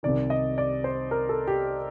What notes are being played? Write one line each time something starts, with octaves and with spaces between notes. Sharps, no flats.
C2 C3 D#3 D5
D#5
D5
C5
A#4
A4
G4